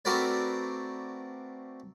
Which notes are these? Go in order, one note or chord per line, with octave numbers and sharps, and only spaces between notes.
A3 C4 F#4 A#4 B4 D5